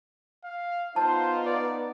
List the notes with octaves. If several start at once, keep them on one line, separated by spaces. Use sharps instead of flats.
F5
B3 D#4 F4 C5 A5
D5